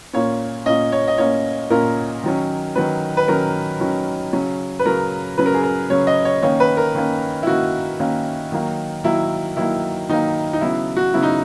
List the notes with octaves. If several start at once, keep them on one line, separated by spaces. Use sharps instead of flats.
A#2 A#3 C#4 C#5
A#2 A#3 C#4 D#5
C#5
D#5
A#2 A#3 C#4 C#5
A#2 A#3 C#4 A#4
D#3 F#3 C#4
D#3 F#3 C#4 B4
B4
D#3 F#3 C#4 A#4
D#3 F#3 C#4
C#3 F#3 C#4
B4
C#3 F#3 C#4 A#4
C#3 F#3 C#4 B4
A#4
G#4
A#4
C#3 F#3 C#4 C#5
D#5
C#5
D#3 A#3 C#4 C#5
B4
A#4
D#3 A#3 C#4
E4
D#3 A#3 C#4 F#4
D#3 A#3 C#4
D#3 F#3 A#3
D#3 F#3 A#3 E4
D#3 F#3 A#3 E4
D#3 F#3 A#3 D#4
D#4
C#3 F#3 B3 E4
F#4
C#3 F#3 B3 E4
D#4